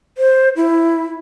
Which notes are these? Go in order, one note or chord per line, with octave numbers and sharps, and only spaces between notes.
C5
E4